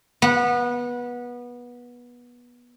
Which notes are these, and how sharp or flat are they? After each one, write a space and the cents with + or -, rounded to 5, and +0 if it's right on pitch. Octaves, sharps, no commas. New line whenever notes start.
B3 -20